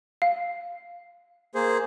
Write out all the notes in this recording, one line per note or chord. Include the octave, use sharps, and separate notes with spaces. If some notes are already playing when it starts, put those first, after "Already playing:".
F5
A#3 G#4 C5